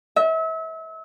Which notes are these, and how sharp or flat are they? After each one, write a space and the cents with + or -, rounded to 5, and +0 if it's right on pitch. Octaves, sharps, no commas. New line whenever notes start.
E5 -35